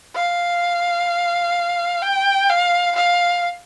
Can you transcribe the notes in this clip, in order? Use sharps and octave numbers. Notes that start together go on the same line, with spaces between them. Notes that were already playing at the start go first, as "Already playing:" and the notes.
F5
G5
F5
F5